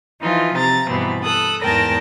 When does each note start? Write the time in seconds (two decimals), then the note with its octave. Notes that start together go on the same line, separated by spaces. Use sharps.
0.21 E3 F3 D#4 F4
0.54 C3 A#5 A6
0.88 G2 B2 E3 B3 C4
1.21 A4 D#6 F#6
1.61 E2 G#2 A#4 G5 A5 A#6